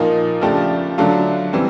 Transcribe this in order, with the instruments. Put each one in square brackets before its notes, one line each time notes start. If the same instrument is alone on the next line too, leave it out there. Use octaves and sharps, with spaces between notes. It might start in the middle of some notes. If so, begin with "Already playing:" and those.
Already playing: [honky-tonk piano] A#2 F3 A#3 D#4
C#3 F3 A3 D4 G4
D3 F#3 A3 D4 F4
E3 G3 C4